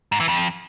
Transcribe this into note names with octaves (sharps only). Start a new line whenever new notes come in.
G#2
E3
F2